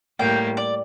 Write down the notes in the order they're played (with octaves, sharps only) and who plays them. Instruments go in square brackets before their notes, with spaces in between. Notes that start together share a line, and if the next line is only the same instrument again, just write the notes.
[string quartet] A2 G3 A#3 [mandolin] G5
[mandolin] D5